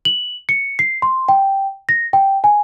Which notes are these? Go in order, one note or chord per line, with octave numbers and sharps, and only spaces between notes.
F#7
C#7
C7
C6
G5
A#6
G5
G#5